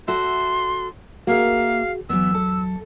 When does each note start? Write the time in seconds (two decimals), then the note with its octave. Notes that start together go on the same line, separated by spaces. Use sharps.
0.08 F#4 A4 E5 C6
1.27 A#3 F#4 G#4 A#4 E5 F5
2.10 E2 E3 F#3 B3 E6
2.34 A4